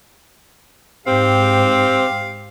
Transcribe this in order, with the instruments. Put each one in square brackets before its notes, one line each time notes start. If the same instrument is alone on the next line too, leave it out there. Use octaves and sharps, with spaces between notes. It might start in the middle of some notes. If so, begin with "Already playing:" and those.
[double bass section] G#2 [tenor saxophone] C4 [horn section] G4 [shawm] F5